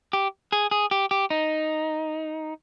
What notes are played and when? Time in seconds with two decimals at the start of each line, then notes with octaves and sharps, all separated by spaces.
0.13 G4
0.52 G#4
0.71 G#4
0.91 G4
1.11 G4
1.30 D#4